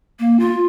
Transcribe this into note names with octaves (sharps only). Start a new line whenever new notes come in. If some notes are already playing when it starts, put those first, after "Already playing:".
A#3
F4